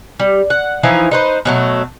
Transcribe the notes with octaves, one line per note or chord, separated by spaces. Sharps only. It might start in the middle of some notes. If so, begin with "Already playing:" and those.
G3
F#5
E3 F3 D#4 E4
D#4 B4 C5
B2 F#3 A3